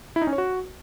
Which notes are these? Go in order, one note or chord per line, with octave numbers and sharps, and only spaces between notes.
E4
D#4
C#4
C#5
F#4